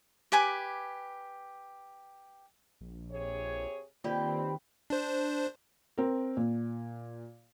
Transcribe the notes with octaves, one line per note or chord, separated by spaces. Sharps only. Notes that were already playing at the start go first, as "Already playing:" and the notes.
G4 B4 G#5 D6
A#1
C3 G#4 C#5
D#3 A#3 C4 F4 G4 B4 D5 G5
D4 C5
C4 A#4
A#2